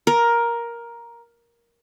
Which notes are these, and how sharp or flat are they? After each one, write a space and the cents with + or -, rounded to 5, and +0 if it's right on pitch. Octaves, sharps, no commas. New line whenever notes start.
A#4 +10